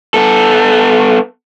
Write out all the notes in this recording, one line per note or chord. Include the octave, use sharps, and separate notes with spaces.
B3 A4